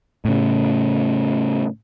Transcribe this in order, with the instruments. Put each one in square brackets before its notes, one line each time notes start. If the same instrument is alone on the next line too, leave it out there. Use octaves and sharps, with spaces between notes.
[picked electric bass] A2 C#3